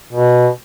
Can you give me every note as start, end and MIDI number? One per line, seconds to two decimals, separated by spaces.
0.13 0.48 47